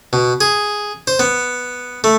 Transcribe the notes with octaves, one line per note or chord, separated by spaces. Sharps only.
B2
G#4
C5
B3
A3